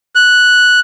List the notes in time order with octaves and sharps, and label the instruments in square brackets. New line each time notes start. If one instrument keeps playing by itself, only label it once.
[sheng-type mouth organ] F#6